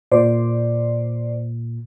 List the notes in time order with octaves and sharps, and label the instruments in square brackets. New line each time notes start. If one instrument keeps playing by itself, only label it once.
[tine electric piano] A#2 [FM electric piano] C5 D5